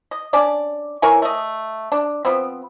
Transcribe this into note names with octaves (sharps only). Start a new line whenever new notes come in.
D#5
C#4 D4 D5
E3 A#4 C#5 G#5
A3 D#5
D4
F3 B3 C4